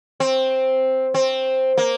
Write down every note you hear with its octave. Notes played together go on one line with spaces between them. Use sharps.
C4
C4
A#3